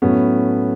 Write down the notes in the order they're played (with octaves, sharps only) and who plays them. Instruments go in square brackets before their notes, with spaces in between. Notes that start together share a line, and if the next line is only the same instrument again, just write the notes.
[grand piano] A2 F#3 A3 B3 C#4